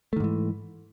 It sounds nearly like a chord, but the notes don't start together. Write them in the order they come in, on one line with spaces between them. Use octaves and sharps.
A3 D#3 G#2 E3